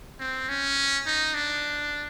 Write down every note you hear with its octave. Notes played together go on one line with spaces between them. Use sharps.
C4
C#4
D#4
D4